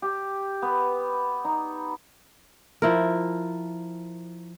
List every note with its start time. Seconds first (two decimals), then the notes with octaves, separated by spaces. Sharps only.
0.02 G4
0.62 B3
1.45 D#4
2.82 F3 E4 A#4